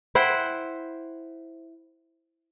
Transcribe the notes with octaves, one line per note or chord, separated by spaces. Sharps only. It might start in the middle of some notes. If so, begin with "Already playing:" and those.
E4 C5 F#5 G5